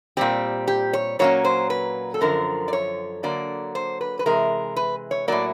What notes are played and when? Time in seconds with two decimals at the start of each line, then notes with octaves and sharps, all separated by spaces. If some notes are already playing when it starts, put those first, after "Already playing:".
0.17 A#2 G3 C4 G4
0.68 G4
0.93 C#5
1.19 A#2 F#3 A#3 C#4 C#5
1.44 C5
1.70 B4
2.14 A4
2.21 F#2 D3 F3 A#4
2.68 D5
2.73 C#5
3.23 D3 F#3 A#3 D5
3.75 C5
4.01 B4
4.19 B4
4.26 C3 E3 G#3 A#4
4.76 B4
5.11 C#5
5.28 A2 F#3 A#3 D5